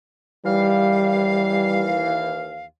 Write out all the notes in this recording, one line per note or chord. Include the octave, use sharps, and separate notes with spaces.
D#2 E3 G3 F5